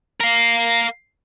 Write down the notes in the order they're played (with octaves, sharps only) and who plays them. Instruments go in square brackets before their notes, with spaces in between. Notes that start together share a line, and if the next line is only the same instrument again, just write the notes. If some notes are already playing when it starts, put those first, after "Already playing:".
[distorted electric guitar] A#4 F5